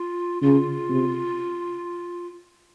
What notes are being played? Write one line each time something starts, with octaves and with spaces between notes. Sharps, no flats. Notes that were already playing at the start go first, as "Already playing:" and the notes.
Already playing: F4
C#3 F4
C3